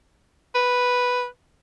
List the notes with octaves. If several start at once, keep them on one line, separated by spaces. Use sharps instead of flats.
B4